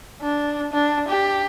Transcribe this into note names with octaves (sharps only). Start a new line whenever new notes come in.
D4
D4
G4